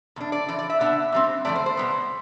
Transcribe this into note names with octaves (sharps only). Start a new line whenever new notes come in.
E2 B2 D4
D5
F2 E3 D5
D5
E5
B2 B3 D4 E5
B2 G3 C4
E2 C3 F3 A3 D5
C5
C5
B2 G3 B3